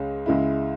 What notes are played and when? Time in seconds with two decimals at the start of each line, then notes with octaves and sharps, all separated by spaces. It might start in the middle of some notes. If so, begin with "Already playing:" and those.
Already playing: C#2 C#3 G#3 C#4
0.26 C#2 C#3 G#3 E4